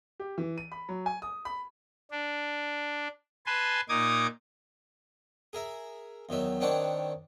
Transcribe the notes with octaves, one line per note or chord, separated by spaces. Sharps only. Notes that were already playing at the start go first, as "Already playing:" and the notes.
G4
E3
D#7
B5
F#3
G#5
D#6
B5
D4
B4 G#5 A5 C6
A#2 D#4 D6 D#6 G#6
G#4 A#4 E5
E2 D#3 F#3 E5
D#3 C4 D4 C#5 D5 F#5